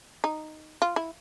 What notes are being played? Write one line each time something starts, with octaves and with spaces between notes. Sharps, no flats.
D#4
F4
E4